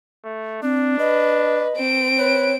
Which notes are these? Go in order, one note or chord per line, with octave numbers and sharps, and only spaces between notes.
A3
C4 D4
B4 D#5
C4 D7
B4 C#5